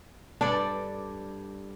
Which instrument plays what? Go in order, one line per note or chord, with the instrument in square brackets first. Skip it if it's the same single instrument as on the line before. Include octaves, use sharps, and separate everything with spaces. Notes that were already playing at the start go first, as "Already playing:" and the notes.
[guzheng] G2 A4 D5 [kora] D4